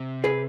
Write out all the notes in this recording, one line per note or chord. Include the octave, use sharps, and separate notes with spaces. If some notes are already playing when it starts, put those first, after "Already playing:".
Already playing: C3
G#4 B4